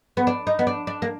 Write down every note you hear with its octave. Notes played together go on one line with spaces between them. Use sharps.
B3
D4
D#4
B3
D4
D4
A#3